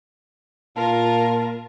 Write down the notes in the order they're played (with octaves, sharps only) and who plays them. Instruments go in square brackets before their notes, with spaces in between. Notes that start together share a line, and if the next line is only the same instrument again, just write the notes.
[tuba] A#2 [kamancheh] F4 A#4 [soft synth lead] A5